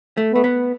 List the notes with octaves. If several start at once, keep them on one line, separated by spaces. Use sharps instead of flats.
A3
A3 B3
B3